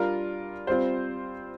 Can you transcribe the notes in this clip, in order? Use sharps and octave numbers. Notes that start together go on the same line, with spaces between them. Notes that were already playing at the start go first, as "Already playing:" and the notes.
Already playing: G3 D4 F4 A#4
G3 C4 F4 C5